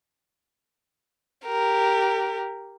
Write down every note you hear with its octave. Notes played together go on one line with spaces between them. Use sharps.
G4 A#4